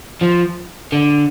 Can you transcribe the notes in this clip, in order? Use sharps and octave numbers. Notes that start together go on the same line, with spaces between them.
F3
D3